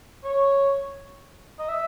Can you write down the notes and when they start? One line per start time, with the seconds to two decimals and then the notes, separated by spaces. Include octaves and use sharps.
0.24 C#5
1.59 D#5
1.68 E5